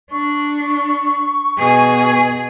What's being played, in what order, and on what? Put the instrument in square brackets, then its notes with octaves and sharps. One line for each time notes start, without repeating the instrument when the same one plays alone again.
[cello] D4 [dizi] C#6
[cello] B2 G#4 [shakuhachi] G#5